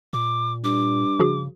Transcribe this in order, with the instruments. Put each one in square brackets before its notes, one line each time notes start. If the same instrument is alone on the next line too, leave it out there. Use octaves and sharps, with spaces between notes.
[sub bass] A#2 [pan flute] D6
[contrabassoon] G2 [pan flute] D6
[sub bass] C#3 [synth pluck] F3 F#4 G#4